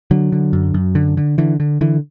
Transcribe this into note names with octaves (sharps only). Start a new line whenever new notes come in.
D3 F#3
D3
F#2
F#2
D3
D3
D3 E3
D3
D3 E3